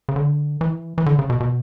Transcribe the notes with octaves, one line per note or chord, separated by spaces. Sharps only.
C#3
D3
E3
E3
D3
C#3
B2
B2